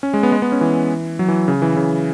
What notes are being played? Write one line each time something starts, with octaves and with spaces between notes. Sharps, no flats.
C#4
G#3
B3
G#3
B3
C#4
E3
F#3
E3
C#3
E3
C#3